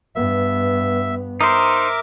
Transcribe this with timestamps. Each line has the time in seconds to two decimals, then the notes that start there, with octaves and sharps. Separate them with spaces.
0.16 G2 B3 E5
1.41 D#4 A#4 C5 E5 D6